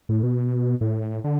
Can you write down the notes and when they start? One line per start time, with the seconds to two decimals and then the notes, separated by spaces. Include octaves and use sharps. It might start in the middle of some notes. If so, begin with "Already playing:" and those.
0.09 A2
0.23 B2
0.81 A2
1.24 D3